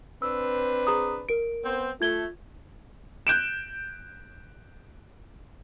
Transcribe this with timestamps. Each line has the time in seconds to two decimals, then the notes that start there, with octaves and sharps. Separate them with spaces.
0.22 C4 D4 B4 E6
0.87 G#4 A#5 D#6
1.29 A#4 D7
1.63 B3 C4 C5
2.01 A3 F4 G#6 G7
3.27 F#6 G6 D7 E7